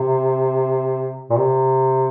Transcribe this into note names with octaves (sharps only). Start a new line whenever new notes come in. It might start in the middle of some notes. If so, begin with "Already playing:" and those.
Already playing: C3
A#2
C3